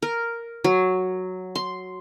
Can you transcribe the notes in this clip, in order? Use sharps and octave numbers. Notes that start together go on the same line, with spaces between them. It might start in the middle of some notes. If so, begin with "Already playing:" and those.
A#4
F#3
C6